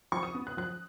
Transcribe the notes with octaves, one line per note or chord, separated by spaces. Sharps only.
F3 C#6
D#6
B3
F#6
F3 F#6